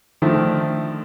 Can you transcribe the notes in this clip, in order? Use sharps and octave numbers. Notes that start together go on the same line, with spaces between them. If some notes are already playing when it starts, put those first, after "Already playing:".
D3 D#3 F3 A3